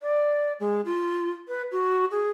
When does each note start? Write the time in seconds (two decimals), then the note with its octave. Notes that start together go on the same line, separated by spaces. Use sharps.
0.01 D5
0.60 G#3
0.85 F4
1.48 B4
1.71 F#4
2.11 G#4